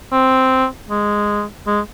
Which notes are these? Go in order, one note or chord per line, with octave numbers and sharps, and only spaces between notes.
C4
G#3
G#3